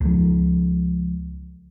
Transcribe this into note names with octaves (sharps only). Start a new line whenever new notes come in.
C#2 F3